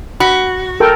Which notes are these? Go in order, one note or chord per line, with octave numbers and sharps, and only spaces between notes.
F#4 B5
A4 A#4 G5